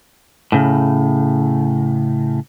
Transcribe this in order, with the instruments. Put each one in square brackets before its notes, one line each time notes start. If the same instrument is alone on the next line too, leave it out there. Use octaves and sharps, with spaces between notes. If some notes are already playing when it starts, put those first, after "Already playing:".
[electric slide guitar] A2 C#3